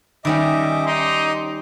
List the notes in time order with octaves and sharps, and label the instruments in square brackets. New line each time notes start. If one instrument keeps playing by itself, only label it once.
[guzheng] D#3 G3 C#4 [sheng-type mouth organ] D#5 E5 D6
[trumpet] D#4 [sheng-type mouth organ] C6 D6